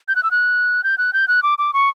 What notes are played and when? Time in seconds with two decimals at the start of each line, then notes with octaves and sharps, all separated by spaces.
0.08 G6
0.16 F#6
0.23 E6
0.31 F#6
0.84 G6
0.98 F#6
1.13 G6
1.28 F#6
1.43 D6
1.58 D6
1.74 C#6